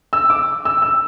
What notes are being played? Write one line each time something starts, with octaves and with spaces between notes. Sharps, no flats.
E6
D6
E6
E6